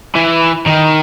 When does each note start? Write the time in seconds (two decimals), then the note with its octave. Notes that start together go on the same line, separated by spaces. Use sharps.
0.15 E3
0.66 D#3